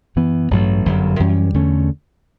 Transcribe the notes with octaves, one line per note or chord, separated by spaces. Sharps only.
F#2 E3 B3
A1 G2 F#3 A3
G1 F#2 D3 F#3
F#2 E3 G3 C#4
E2 D3 A3 C#4